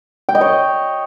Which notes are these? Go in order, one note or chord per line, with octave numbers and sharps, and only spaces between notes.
G5
D#5
C#5